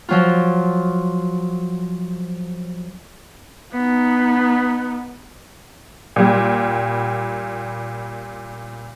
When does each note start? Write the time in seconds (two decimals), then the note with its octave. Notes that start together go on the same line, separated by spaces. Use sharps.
0.09 F3 F#3 F4
3.73 B3 D#4
6.16 A#2 G3